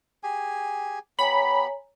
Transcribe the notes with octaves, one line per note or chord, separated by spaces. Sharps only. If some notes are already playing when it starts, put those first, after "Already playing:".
G4 G#4 G#5
B3 G4 C#5 G#5 A#5 B5